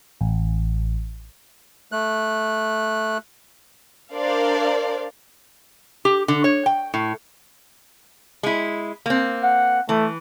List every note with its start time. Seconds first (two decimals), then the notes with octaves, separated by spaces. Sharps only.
0.21 A1
1.92 A3 F#6
4.12 D4 A#4 C5 D5 F5
6.05 G4
6.28 D3
6.44 C#5
6.66 G5
6.94 A2
8.43 G#3 E4
9.06 A#3 C4
9.43 F#5
9.89 E3 A3